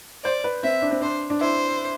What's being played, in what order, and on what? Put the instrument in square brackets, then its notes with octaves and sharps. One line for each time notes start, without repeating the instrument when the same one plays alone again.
[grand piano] C5 [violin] D5
[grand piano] B4
[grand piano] C4 [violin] E5
[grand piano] D4
C4
[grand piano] D4 [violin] C5
[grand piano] D4
[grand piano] E4 [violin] C5